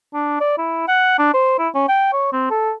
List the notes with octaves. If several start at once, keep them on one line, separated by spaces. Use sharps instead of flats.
D4
D5
E4
F#5
D4
C5
E4
C#4
G5
C#5
C4
A4